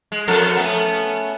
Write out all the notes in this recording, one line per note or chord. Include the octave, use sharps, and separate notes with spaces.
G#3
F2 A4 A#4 F#5 A5
A3 B3 C#4